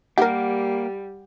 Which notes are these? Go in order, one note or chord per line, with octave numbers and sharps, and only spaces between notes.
G3 A#3 G4 A#4 F#5